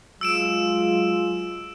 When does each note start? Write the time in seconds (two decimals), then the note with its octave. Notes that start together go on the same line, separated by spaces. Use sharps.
0.21 F#3 G#3 F4 E6 D7 E7